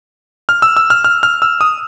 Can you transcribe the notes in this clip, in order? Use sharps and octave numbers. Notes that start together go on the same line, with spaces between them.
F6
E6
E6
F6
F6
F6
E6
D#6